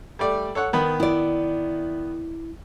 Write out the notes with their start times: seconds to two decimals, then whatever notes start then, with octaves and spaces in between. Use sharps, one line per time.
0.19 G3 A3 D5
0.55 A4 C#5 F#5
0.73 D#3 B3 B5
1.00 E4 D5